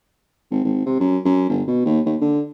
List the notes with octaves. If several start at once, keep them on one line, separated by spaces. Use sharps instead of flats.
G#1
G#1
C3
F#2
F#2
G1
B2
D#2
D#2
D3